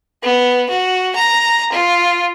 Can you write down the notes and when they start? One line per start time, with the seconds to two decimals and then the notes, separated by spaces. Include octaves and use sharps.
0.22 B3
0.69 F#4
1.15 A#5
1.72 F4